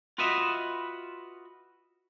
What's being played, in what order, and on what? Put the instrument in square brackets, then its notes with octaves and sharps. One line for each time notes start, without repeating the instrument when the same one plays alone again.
[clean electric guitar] F4 F#4 B4 D#5 E5